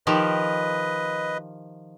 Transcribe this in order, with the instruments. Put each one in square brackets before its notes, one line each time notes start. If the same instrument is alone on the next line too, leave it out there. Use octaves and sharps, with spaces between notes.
[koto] D#3 F3 G4 [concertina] B4 D#5